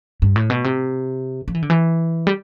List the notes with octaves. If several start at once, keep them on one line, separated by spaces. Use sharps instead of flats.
G2
A2
B2
C3
F3
E3
D3
E3
G3